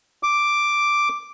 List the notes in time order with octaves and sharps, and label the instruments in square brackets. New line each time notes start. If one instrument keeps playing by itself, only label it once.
[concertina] D6